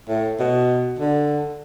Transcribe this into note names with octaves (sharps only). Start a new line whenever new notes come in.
A2
B2
D3